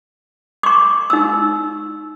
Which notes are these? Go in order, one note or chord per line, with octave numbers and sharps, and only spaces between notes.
C#6 D6
D#4 E6